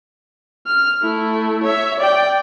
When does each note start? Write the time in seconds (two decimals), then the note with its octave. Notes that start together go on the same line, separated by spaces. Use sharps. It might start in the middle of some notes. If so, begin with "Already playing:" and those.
0.67 F6
1.03 A3 E4
1.63 C#5 E5
1.99 D5 G5